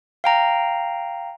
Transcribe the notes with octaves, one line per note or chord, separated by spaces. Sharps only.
F5 G5 A#5